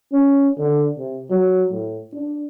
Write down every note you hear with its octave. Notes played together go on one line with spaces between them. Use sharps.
C#4
D3
C3
F#3
A2
D4